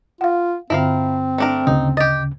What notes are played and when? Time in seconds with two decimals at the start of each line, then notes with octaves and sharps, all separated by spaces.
0.21 F4 F5 F#5
0.70 G2 D3 C4 E4 A#4 F5
1.38 A3 D4 A#4
1.67 D2 C#3 D#4
1.97 G4 D#5 A6